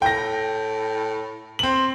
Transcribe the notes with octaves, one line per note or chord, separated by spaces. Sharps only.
A2 G5 A#6
C4 F#7